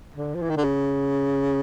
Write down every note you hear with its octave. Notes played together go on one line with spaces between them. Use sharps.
D3
F3
E3
D#3
D3
C#3